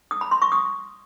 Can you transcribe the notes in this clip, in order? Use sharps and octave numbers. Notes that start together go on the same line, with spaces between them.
D#6
B5
C6
C#6
D#6